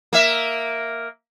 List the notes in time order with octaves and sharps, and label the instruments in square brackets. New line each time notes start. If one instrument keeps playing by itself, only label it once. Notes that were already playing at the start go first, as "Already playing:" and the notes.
[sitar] A#3 E5